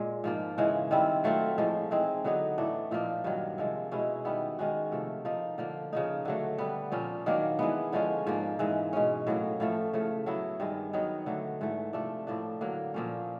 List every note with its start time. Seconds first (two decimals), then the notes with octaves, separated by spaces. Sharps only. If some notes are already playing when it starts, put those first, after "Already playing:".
Already playing: A#2 G#3
0.24 G#2 F3 A#3
0.58 C#3 E3 G#3
0.91 D#3 G3 C4 E4
1.24 F#3 A3 C4 F4
1.58 A2 F3 G#3
1.91 E3 G#3 C4 D#4
2.24 D3 F#3 B3 D#4
2.58 A2 E3 A3 D4
2.91 A#2 F3 A#3 D#4
3.24 G2 D#3 F#3
3.58 C3 F3 G#3
3.91 B2 G#3 C#4 E4
4.25 D#3 G3 B3 E4
4.59 D#3 G#3 C#4 F#4
4.92 C3 F3 A3
5.25 F3 A#3 D#4
5.58 D3 F3 A#3
5.93 C#3 F3 A#3 D#4
6.25 D3 F#3 A3
6.58 D3 G3 B3
6.92 A#2 F3 A#3 C#4
7.26 D#3 F#3 A#3 D4
7.59 E3 G#3 B3
7.92 D3 F3 G#3 C#4
8.27 G#2 F3 A#3
8.59 G#2 E3 G#3
8.93 B2 G#3 C#4
9.27 A2 F#3 A#3
9.60 A2 F3 A3
9.93 C#3 F3 A3
10.26 F#3 B3 E4
10.60 G2 D#3 G#3
10.93 D#3 F#3 B3 D#4
11.26 D3 F#3 A3
11.61 G#2 E3 A3
11.93 C3 F3 A3 D4
12.27 A2 F3 A#3 D4
12.61 D3 F#3 A#3
12.94 A#2 F3 A#3 C#4